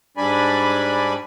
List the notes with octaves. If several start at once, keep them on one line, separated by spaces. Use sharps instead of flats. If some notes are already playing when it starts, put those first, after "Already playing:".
G#2 G3 D4 D5 G#5 B5